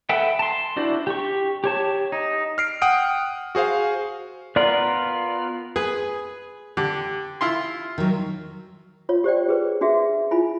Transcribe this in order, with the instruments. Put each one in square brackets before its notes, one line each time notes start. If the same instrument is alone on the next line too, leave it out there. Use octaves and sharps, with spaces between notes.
[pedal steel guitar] A4 B4 E5 F#5 G5
A5 C6
D4 E4 F#4 C5 D5
G4 C#6
G4 C#5 A5
D#4
[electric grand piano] F6 C7 D7
F#5 G5 D#6 F6 D7
F#4 G#4 C5 F5
[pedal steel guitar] B3 F4 A#4 [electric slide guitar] D5
[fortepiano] G#4 [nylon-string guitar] B4
[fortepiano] D3 [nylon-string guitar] G4
[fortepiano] E4 F4 C6
[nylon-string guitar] D#3 F#3
[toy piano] F4 C#5
G4 C5 D5 G5
G#4 B4
D4 F#4 G#4 E5
E4 F4 G#5 B5